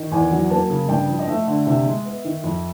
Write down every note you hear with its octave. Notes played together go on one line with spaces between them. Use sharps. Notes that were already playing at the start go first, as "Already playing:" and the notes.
Already playing: D#3
E2 G#5
F#3
A#3 A5
C#3
G2 G5
F3
D#5
A3 E5
D3
C3 E5
G#3
B3
D#3
F2